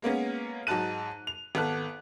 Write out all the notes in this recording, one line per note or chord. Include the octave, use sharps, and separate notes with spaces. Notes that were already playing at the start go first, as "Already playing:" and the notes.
G#3 A#3 B3 C#4
G#2 F#3 D#4 A5 F#6 D#7
F7
G#1 B3 A4 F#6